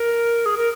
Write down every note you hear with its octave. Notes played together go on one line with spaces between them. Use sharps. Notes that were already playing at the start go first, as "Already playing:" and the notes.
Already playing: A#4
G#4
A#4